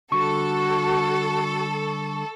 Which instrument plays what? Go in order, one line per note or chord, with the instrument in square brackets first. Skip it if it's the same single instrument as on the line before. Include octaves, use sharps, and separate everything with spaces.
[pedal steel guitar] D3 G3 [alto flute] F#4 [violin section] A4 [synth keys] C#6